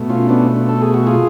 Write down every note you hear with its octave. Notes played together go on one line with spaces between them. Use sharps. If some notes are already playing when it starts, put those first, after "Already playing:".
Already playing: B2 A3
C#4 F4
B3 D4
A4
G#4
F#4
F4 G#4